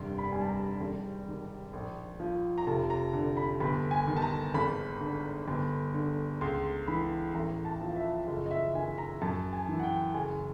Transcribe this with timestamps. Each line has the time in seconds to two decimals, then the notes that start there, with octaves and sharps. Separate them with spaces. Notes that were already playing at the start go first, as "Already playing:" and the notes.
Already playing: F1 G2 D#3 C6
0.18 B5
0.32 G3 G#5
0.41 A5
0.49 A#5
0.81 G#1
1.27 D#3
1.73 A#1
2.20 F3
2.58 A#5
2.67 F1 A5
2.90 A#5
3.13 D3
3.37 B5
3.60 G1 B5
3.91 G#5
4.07 D#3
4.16 A5
4.22 A#5
4.54 G#1 B5
5.01 D3
5.48 G1
5.94 D3
6.41 C#2 C6
6.88 E3 B5
7.34 A1 A#5
7.65 A5
7.81 F3
7.96 E5
8.27 F#1 D#5
8.46 D#5
8.51 E5
8.74 D#3 G#5
8.98 A#5
9.21 F#2 A5
9.53 G#5
9.68 E3
9.79 F#5
9.83 G5
10.14 F#1 G#5